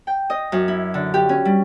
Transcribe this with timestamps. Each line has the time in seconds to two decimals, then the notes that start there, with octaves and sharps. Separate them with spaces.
0.07 G5
0.30 D#5
0.52 F#2
0.68 E4
0.94 D3
1.14 G4
1.29 C#4
1.45 G3